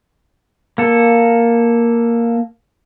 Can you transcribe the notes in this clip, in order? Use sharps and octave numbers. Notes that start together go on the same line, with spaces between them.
A#3 A4